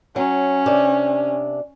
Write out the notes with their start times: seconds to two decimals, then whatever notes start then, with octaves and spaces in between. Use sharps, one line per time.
0.16 F#3 C#4
0.66 C3 D4